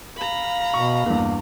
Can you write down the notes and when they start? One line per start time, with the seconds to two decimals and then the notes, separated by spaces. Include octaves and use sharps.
0.17 F5 A#5 B5
0.74 B2 C#6
1.06 E2 G2 A#3